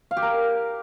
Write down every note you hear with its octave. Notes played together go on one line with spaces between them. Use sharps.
F5
G4
A#4